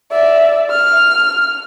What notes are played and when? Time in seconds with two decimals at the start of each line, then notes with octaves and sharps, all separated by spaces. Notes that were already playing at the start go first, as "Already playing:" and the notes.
0.11 D5 E5
0.71 F6